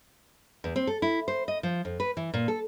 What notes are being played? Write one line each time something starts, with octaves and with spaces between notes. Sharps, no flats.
E2
C4
A4
E4
C5
D#5
F3
F2
B4
E3
A#2
A4